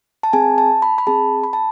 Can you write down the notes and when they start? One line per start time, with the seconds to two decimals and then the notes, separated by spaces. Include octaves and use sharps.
0.23 A5
0.33 C4 G#4 G#5
0.58 A5
0.82 B5
0.98 B5
1.07 C4 G#4 A5
1.43 B5
1.53 A5